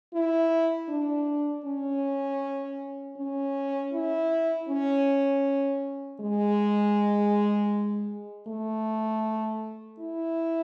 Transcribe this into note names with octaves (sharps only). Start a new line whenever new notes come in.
E4
D4
C#4
C#4
E4
C#4
G#3
A3
E4